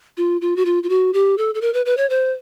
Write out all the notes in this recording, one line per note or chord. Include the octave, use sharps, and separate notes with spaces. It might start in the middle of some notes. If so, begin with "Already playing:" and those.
F4
F4
F#4
F4
F4
F#4
G4
A4
A4
A#4
B4
B4
C#5
C5